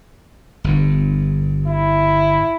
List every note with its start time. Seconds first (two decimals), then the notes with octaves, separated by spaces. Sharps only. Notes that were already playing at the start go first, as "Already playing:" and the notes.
0.64 G1 G2
1.67 E4